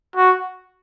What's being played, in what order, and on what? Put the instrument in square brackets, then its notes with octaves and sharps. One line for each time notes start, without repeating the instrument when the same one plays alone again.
[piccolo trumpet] F#4